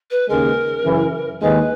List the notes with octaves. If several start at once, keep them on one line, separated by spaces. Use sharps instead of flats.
B4
D#2 C#3 G#3 A#4
F#2 C#3 E3
D#2 D#3 G#3 B4